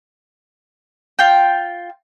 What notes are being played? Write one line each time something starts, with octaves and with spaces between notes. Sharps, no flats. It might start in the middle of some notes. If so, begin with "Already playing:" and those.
F4 G5